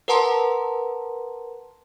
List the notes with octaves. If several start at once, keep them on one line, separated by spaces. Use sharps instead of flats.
A#4 B4 F#5 A5 A#5 C6